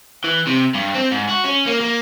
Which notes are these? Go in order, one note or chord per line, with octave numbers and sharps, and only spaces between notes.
E3
C3
G2
C4
G#2
F#4
C#4
A#3
A#3